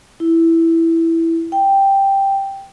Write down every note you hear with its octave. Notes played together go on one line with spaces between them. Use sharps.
E4
G5